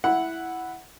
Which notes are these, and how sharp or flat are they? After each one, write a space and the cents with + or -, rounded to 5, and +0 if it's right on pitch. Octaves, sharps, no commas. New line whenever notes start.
E4 +0 F#5 +0